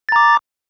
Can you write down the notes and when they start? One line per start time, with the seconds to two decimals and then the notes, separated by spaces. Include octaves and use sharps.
0.09 A6
0.12 A#5
0.16 D6